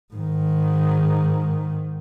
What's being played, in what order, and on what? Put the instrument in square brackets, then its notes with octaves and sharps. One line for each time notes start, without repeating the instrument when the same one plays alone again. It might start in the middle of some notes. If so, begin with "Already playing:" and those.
[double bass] G#2 D#3